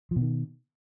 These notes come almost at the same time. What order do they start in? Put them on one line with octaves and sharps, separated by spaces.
F3 B2 D#3